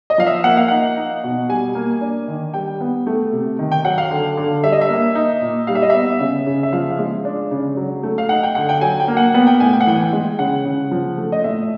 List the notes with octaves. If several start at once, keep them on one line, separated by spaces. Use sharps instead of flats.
D#5
F3 F5
E5
A#3 F#5
F5
D#4 F#5
D#4
B2
G3 G#5
A#3
D4
D#3
G3 G5
B3
A3
C3
D#3
G5
F#3 F#5
F5
D3
D3
G3 E5
D#5
E5
A#3
D#4
A#2
G3 F5
E5
D#5
B3 E5
C#3
C#3
E5
F3 F5
F5
G#3
D4
C#3
F#3
A3
F5
D#4 F#5
G5
D3 F#5
G5
F#3 G#5
G5
A#3
F#5
B3 F#5
G5
A2 G#5
G5
F#5
E3 G5
G#3
C#3 F#5
C#3
F3
A3
D#5
A2 E5